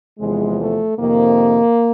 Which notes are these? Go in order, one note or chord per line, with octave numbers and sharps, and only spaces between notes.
E2 C3 F3 G#3
A3
F2 C3 D#3 A#3